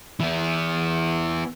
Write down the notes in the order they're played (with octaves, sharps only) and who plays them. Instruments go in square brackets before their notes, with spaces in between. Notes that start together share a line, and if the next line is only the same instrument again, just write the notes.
[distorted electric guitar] E3 B3